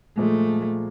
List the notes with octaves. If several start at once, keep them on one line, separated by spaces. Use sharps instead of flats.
A#2 F3 G#3 A3